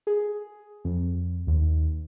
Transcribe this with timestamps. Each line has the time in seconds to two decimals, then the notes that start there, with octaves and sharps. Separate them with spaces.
0.07 G#4
0.85 F2
1.47 D#2